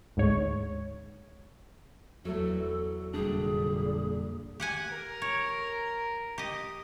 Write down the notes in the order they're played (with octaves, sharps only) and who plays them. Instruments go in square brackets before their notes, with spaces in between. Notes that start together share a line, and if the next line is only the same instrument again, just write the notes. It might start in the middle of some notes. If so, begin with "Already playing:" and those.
[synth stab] G#1 D2 G#2 C#5
[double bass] E2 [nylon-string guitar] F#3 A3 [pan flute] A4
[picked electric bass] F1 G3 D4 [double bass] A#2 D3 [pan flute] G#4
[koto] G4 F#5 G#5
[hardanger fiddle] A#4
[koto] C#5
G4 D#5